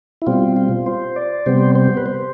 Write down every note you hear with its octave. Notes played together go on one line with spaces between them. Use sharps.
E4
B2 G3 C4 F4
F4
C5
D5
C3 G3 B3 C5
C5
B4
C5